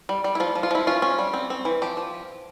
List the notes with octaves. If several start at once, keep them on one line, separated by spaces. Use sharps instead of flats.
G3
G3
E4
F3 F4
F3
F4
F3 E4
C#4 F4
C#4
G3
C4
C4
E3
F3 G4
F3